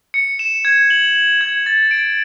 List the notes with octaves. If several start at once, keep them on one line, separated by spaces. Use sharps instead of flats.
C#7
E7
G#6
F#7
F#7
G#6
A6
D7